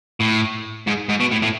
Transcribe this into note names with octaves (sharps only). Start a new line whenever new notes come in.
A2
G#2
G#2
B2
A2
A2